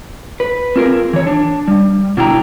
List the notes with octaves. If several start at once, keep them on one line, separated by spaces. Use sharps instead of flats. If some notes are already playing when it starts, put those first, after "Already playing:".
B4
C4 F4 G#4 A#4
E3 C#5
D4
G3
B2 D3 D4 E4 G5 A#5